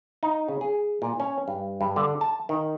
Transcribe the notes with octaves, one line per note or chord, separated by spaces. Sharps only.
D#4
C#3
G#4
A#2
C#4
G2
G2
D3
A5
D#3